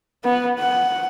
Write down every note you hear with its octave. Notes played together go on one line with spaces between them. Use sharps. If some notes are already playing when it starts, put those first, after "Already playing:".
B3
F#5